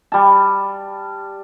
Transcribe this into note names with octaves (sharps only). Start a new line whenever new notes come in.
G3 A5